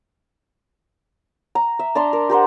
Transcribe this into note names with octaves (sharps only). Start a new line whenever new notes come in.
A#5
E5
D4 D5 A#5 C6
A#4
G4 A#4 C5 F#5